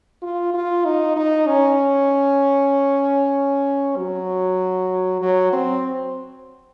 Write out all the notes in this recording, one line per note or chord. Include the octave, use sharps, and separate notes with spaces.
F4
F4
D#4
D#4
C#4
F#3
F#3
C4